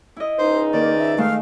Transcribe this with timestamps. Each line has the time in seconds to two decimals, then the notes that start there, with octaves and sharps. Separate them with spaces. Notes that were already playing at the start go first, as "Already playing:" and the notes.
0.16 E4 D#5
0.39 C#2 G#2 D#4 C5
0.73 D#3 A#3 D5
0.99 E5
1.18 D#3 G#3 A3 F5